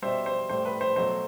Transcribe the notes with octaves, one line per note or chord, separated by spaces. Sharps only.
B2 G3 C5 E5
C5
A2 G3 C5
B4
C5
B2 F#3 A3 C5